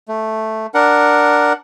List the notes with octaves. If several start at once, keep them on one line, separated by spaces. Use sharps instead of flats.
A3
D4 A#4 F#5